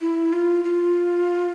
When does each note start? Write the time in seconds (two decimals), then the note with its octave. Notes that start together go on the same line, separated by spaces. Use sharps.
0.01 E4
0.33 F4
0.64 F4